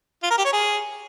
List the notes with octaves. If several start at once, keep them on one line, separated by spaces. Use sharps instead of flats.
F4
A#4
G4
C#5
G#4